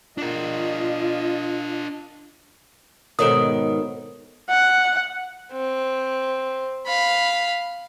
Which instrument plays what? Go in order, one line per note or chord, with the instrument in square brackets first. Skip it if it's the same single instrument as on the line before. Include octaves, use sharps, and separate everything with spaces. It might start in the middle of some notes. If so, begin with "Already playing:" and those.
[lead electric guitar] D4 A#4 [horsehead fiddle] F4 D#5
[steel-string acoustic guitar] G#2 B2 D#3 [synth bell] A4 C#5 D#6
[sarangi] F#5
[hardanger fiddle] C4
F5 B5